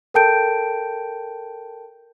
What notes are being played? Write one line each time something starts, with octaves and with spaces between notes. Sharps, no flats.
A4 A#4 G5 A5 G6 D7